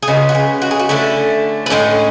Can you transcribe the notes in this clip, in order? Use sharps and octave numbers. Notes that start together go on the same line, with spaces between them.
G#4
C#3 G#3 B3 F#4
F#4
G#4
F#4
G#4
F#4
D3 A3 C#4 E4
B4
A2 G#3 C#4 A4